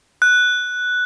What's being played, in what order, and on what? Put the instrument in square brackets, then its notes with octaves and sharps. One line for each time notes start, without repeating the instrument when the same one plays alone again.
[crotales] F#6